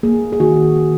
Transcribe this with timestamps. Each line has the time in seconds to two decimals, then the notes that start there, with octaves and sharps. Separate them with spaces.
0.03 A#3 G#4
0.32 G#4
0.40 D#3 F#4
0.77 D#3